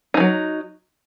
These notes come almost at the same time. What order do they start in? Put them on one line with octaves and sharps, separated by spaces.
D#4 E3 F#3